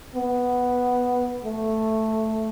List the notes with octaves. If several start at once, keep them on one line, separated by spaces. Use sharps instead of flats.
B3
A3